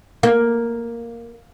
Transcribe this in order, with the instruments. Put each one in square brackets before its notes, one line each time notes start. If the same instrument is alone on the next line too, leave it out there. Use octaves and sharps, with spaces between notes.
[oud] A#3